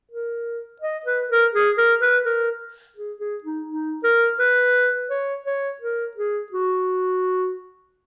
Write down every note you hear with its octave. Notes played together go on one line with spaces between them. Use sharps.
A#4
D#5
B4
A#4
G#4
A#4
B4
A#4
G#4
G#4
D#4
D#4
A#4
B4
C#5
C#5
A#4
G#4
F#4